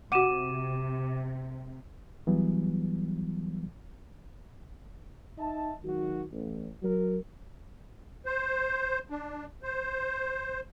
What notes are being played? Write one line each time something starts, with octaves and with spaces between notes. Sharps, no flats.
C3 F#4 F#5 D6 D#7 E7
E3 F#3 G3 B3
D#4 D#5 E5 A5
G#1 D#3 F#3 D#4 F#4
A1
F#3 A#4
C5
D4
C5